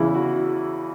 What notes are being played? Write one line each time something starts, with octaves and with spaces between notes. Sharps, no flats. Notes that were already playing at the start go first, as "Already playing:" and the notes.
Already playing: E2 C#3 E3 E4
F#4